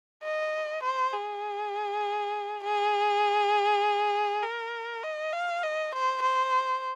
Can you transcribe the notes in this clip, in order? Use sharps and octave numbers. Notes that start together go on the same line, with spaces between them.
D#5
C5
G#4
G#4
A#4
D#5
F5
D#5
C5
C5